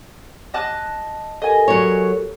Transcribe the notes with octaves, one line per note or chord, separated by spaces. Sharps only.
D#5 A5 F#6
G4 A4 A#4 D#5 G#5
F#3 C#5